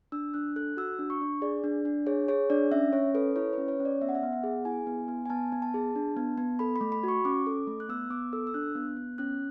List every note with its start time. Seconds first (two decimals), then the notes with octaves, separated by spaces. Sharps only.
0.12 D4 E6
0.34 D4 F#6
0.56 A4 F#6
0.77 F#4 E6
0.99 D4
1.10 C#6
1.21 D4
1.42 G#4 D5
1.64 D4
1.85 D4
2.07 G#4 C#5
2.28 G#4 C#5
2.50 D4 D5
2.72 C#4 E5
2.93 C#4 C#5
3.15 A4 B4
3.36 E4 C#5
3.53 C#4 B4
3.68 C#5
3.80 C#4
3.85 D5
4.02 B3 E5
4.09 F#5
4.15 E5
4.23 B3
4.33 F#5
4.44 G#4
4.65 E4 G#5
4.87 B3
5.08 B3
5.26 G#5
5.30 B3 A5
5.52 B3
5.62 A5
5.74 G#4
5.95 D4
6.17 B3
6.38 B3
6.59 A4 B5
6.76 B5
6.81 A3
6.92 B5
7.03 F#4 C#6
7.25 C#4 D6
7.47 A4
7.67 A3
7.80 F#6
7.89 B3 E6
8.10 B3 D6
8.33 A4 E6
8.47 E6
8.54 D4 F#6
8.75 B3
8.97 B3
9.18 C#4 F#6